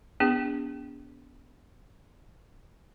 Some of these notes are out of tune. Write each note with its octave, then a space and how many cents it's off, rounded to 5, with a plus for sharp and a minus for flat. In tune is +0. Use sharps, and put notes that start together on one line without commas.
B3 +0 D4 -30 G#4 -40